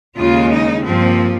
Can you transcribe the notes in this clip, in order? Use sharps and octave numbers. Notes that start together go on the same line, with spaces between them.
D#2 C#3 G#3 F4
D#4
G2 F3 A#3 C4